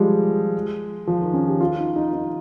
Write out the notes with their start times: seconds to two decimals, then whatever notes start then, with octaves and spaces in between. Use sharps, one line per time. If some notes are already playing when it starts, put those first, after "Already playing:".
Already playing: F3 G3 G#3
1.07 F3
1.21 D#3
1.34 C#4
1.48 G4
1.61 F4
1.78 D#4
1.96 D#4
2.13 D#4